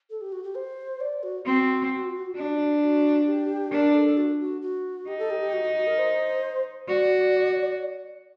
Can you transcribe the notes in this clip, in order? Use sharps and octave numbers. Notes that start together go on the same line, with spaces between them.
A4
G4
F#4
G4
C5
D5
F#4
C4 F#4
D4
F#4
G4
D4 A#4
A4
F#4
F#4
F#4
D#4 G4
A4
G4
G4
F#4
F#4
F#4
A#4
C5
F#4 D5